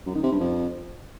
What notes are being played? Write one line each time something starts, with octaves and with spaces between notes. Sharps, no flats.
F#2
D#3
C3
G2
F2